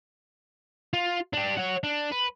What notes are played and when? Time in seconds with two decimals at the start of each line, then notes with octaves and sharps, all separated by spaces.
0.94 F4
1.34 D4 G4
1.58 C#5 F#5
1.84 D4
2.12 B4